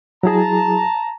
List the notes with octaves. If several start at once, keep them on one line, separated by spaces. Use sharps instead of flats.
F#3 E4 G#4 A5 A#5